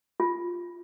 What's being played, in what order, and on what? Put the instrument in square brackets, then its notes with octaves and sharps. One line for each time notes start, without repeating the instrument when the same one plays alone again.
[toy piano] F4